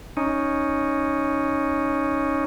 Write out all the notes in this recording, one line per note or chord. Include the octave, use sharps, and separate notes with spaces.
C#4 D#4